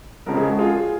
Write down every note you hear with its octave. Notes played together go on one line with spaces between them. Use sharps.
C#2 C#3 F3 A#4
G#4
F#4
F4 G#4